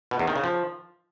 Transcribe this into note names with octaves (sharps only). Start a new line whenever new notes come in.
B2
E2
D#3
C#3
F3